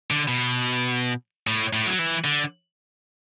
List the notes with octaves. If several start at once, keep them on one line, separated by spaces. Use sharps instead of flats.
D3
B2
A2
A2
F#3
E3
D3